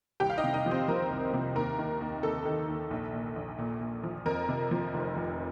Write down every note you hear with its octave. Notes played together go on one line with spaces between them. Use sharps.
C2 G4 G5
F5
D#4 D#5
C3
D#4 D#5
F3
C4 C5
F3 A#4
C2
C3
D#2 A#4
D#3
D#2
D#2 A4
D#3
D#2
A#1
A#2
A#1
A#2
A#2
F3
F2 A#4
C3
F3
F1
F1